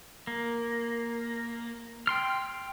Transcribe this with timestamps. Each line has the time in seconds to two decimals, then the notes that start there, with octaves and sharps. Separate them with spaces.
0.27 A#3
2.07 G5 C6 F6